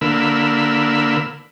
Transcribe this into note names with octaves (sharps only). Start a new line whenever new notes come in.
D3 A#3 B5 E6